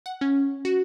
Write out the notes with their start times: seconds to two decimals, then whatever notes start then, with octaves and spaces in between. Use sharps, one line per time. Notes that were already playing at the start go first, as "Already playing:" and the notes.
0.06 F#5
0.21 C#4
0.65 F#4